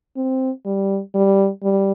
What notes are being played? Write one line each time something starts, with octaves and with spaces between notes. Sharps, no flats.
C4
G3
G3
G3